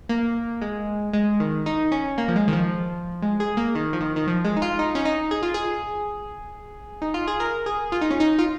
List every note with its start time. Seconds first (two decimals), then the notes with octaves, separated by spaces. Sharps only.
0.09 A#3
0.62 G#3
1.13 G#3
1.40 D#3
1.66 D#4
1.92 C#4
2.18 A#3
2.28 F3
2.36 G#3
2.48 D#3
2.53 F3
3.22 G#3
3.40 G#4
3.57 A#3
3.75 D#3
3.93 F3
4.01 D#3
4.16 D#3
4.27 F3
4.45 G#3
4.57 D#4
4.62 F4
4.79 D#4
4.95 C#4
5.05 D#4
5.31 G#4
5.42 F4
5.54 G#4
7.02 D#4
7.14 F4
7.27 G#4
7.40 A#4
7.66 G#4
7.92 F4
8.01 D#4
8.11 C#4
8.20 D#4
8.39 F4